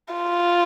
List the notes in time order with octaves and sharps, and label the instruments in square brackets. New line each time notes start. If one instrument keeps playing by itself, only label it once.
[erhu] F4